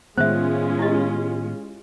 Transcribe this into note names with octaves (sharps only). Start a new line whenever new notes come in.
A2 D#3 G#3 B3 C#4 F4 C5 E5
E4 G4 D#5